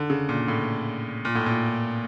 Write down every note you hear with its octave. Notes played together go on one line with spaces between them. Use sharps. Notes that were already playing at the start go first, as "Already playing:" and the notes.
Already playing: D3
C#3
A#2
A2
A#2
A2
A#2